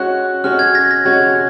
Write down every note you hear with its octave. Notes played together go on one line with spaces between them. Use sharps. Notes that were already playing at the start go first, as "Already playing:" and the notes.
Already playing: G#3 C#4 F#4 C#5 F#6
G#3 C#4 F#4 C#5 F6
G#6
A#6
A#6
G#3 C#4 F#4 C#5 G#6